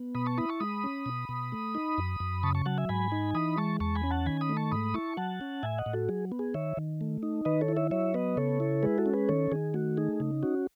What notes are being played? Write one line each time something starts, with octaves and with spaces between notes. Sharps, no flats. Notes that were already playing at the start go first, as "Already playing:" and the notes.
Already playing: B3
B2 B5 D#6
A5 C#6
E4 B5 D#6
A5 C#6
G#3 B5 D#6
C#4
B2
B2
A3
D#4
F#2
F#2
C#3 A5 C#6
A5 C#6
F#3 F#5 A5
E5 G#5
G#2 G#5 B5
D#4
E3 B5 D#6
G#3 A5 C#6
E2 A5 C#6
G#5 B5
C#4
F#5 A5
D#3 G#5 B5
B5 D#6
A3
A5 C#6
G#2 B5 D#6
E4 A5 C#6
F#3 F#5 A5
C#4
A2 E5 G#5
D#5 F#5
A2
F#4 A4
F#3 G#4
B3
G#4
D#3 C#5 E5
D#3
A3
D#4
D#3 B4 D#5
A4 C#5
E4
C#5 E5
F#3 C#5 E5
B3 B4 D#5
C#3 A4 C#5
E4
G#3 G#4 B4
F#4 A4
C#4
G#4 B4
D#3 A4 C#5
D#3 G#4
A3 F#4
D#4 G#4
C#3
C#4 F#4